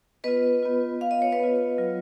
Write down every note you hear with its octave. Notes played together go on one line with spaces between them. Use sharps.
B3 F4 B4 D#5
B3 F4
B3 F4 F5
D#5
C#5
B4 D#5
B3 F4
F#3 B3 F4